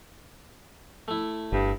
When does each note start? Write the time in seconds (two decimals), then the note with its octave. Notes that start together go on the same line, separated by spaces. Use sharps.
1.08 A3 E4
1.52 G1 G2